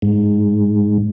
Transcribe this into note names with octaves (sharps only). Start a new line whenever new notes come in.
G#2